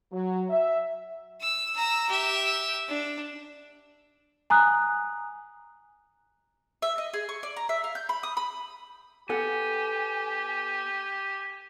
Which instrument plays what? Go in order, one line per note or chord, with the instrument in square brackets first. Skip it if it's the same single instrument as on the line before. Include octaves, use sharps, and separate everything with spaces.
[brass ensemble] F#3
E5
[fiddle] E6
A#5 E6
G4 E5
D4
[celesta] G#5 A#5 D#6 F#6
[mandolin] E5
D#5
G#4
C#6
D5
A#5
E5
F5
G6
B5
D#6
B5
[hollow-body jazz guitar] B3 A4 F#5 [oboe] G4 [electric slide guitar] G#5